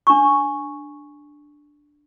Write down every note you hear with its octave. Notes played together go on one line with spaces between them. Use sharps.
D4 C#6